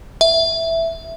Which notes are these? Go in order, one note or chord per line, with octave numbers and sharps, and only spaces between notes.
E5